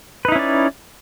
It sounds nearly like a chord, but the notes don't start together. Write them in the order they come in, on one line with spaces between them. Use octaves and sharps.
B4 D#4 E4 C#4 D5